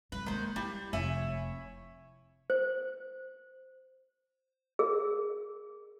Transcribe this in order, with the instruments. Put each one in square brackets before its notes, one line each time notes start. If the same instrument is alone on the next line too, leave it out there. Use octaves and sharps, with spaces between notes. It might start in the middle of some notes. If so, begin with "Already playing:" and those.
[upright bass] D3 G3 [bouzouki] B4
[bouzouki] D#3 C5 [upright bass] G#3 A#3
[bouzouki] G3 [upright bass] E4
[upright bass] F1 F2 [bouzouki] E4 C#5 G#5
[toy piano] C5
G#4 A#4